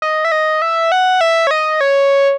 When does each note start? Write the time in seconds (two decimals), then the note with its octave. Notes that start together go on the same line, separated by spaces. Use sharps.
0.02 D#5
0.25 E5
0.32 D#5
0.62 E5
0.92 F#5
1.21 E5
1.47 C#5
1.51 D#5
1.81 C#5